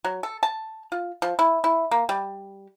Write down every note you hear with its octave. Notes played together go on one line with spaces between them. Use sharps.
F#3
A4
A5
F4
F3
E4
E4
A#3
G3